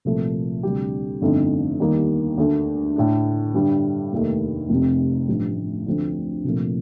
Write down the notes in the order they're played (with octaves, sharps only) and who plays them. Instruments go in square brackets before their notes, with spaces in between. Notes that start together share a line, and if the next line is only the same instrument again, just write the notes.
[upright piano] C2 A#2 F3 A3
D2 C3 G3 D4 G4
G1 F2 D3 A3 D#4
D#2 D#3 G3 A#3 D#4
D2 D3 A3
A2 A3 D4
G2 D3 G3
F1 D#2 D#3 A3
F1 F2 C3
A1 G2 F3
D2 D3 F3 A3 C4
C2 A#2 F3 A3